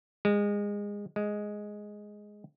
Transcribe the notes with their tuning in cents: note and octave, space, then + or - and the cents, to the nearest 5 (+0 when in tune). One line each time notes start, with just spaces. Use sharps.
G#3 -25
G#3 +0